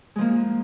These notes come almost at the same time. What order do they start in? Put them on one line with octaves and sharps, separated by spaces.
G#3 F3 A#3